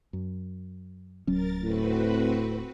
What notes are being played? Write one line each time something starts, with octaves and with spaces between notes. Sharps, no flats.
F#2
D1 F#3 C#4 A#4 A6
A2 C4 F#4 B4